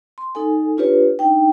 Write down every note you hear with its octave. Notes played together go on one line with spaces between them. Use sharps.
C6
D#4 A4 G#5
D4 F4 G4 B4 C#5
D4 D#4 G5